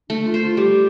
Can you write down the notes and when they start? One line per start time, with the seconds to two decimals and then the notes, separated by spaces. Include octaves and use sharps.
0.10 A3 D4
0.26 F4
0.34 C5
0.42 F4
0.57 G3 G4